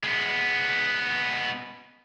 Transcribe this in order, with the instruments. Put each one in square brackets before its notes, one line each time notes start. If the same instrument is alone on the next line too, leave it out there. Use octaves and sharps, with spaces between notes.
[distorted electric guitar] G#3 B3